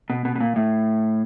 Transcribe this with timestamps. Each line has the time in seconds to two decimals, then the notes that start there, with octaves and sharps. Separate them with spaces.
0.10 B2
0.25 B2
0.35 B2
0.40 A#2
0.56 A2